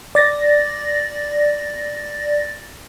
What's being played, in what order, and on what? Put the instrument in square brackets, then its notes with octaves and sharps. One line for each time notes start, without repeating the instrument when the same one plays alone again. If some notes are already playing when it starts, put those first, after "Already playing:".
[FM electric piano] D5 A6 A#6